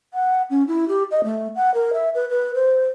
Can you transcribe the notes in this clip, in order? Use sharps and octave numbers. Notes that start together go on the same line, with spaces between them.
F#5
C#4
E4
G4
D#5
A3
F#5
A#4
E5
B4
B4
C5